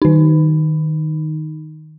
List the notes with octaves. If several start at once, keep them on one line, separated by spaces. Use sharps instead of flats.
D#3 D#4